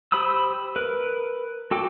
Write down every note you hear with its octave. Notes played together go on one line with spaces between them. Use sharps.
G4 C5 B5 D#6 E6
A#4 B4
F#4 A4 G5 D6